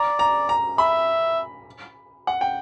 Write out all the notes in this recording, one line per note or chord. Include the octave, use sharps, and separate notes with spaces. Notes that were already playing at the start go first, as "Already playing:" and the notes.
Already playing: D5 A#5
A#5
A#5
E5 B5
F#5
G5